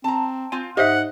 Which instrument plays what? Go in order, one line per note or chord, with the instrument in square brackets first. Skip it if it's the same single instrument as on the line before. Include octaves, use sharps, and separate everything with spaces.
[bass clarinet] C4 [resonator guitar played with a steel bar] A5 A#5
[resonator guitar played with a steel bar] C4 F4 [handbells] G#5
[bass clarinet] G#2 [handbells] G4 C5 E5 [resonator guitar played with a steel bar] D#5 [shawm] F#5